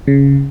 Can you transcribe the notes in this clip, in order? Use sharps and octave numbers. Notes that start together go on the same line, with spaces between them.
C#3